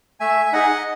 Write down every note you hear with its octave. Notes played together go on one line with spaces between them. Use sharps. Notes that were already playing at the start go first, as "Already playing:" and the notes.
A3 E5 G#5
E5
D#4 G#4 D#5 F#5